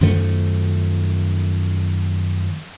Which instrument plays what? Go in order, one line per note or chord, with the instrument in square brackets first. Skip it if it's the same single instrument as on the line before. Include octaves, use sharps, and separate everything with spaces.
[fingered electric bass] F#2 D#3 F3 A3